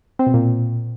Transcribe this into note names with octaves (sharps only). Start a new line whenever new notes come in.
C4
B2
A#2